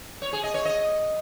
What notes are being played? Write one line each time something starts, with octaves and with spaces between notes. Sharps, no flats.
C#5
G#4
D#5
C#5
D#5